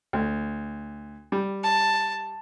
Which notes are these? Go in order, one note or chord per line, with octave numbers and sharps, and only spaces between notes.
D2
G3
A5